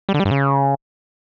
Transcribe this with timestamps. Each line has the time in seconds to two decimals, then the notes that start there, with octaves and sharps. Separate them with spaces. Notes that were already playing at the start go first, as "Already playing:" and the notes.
0.09 G3
0.14 D3
0.20 G3
0.25 G2
0.31 C#3